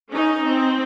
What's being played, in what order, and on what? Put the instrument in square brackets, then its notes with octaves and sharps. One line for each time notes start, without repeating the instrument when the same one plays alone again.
[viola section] C#4 D#4
C4